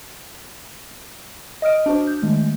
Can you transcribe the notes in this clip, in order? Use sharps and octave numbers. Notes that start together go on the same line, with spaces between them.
D#5 D#6 F6 D7
D4 F#4 C5
G6
D#3 G#3 A3